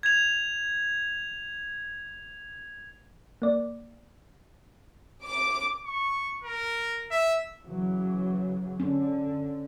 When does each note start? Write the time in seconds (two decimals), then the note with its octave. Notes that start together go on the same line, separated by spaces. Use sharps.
0.03 G#6 F7
3.42 A#3 D5
5.23 D6
5.85 C#6
6.44 A#4
7.11 E5
7.63 C#3 E3 F#3
8.80 D3 C#4